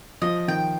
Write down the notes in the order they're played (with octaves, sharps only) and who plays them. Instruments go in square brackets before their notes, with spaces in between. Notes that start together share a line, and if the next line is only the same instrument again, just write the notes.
[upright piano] F3 [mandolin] D#5
[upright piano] D#3 [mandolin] G5